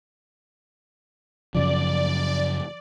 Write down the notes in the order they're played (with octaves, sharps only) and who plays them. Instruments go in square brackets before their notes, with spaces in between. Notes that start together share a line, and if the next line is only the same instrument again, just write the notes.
[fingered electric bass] F#2 C#3 F3 [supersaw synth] D5